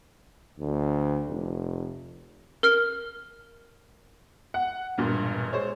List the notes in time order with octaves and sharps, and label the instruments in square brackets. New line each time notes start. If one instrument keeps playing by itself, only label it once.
[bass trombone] D2
F1
[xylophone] A#4 F6
[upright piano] F#5
E1 G2 A#2
G#3 C5 C#5